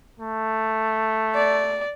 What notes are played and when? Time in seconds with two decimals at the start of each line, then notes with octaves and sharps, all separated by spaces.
0.20 A3
1.35 D5